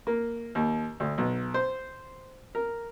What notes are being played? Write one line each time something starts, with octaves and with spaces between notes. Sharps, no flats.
A#3
D#2
D2
B1
C5
A#4